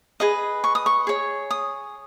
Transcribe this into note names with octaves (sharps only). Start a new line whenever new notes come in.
G#4 B4 D#5
C#6
D#6
C#6
G#4 C#5
D#6